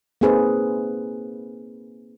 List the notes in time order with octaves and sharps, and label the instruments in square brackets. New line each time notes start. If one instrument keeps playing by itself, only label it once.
[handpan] A#3 C4 D#4 G#4 B4 C5